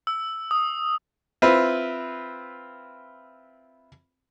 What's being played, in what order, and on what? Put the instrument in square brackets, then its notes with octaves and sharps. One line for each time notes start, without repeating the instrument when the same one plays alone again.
[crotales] E6
D#6
[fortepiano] C4 E4 F4 B4